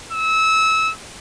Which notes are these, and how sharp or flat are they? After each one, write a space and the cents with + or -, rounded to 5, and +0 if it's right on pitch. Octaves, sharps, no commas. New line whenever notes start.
E6 -25